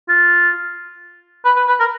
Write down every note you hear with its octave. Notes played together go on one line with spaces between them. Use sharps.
F4
B4
B4
B4
A#4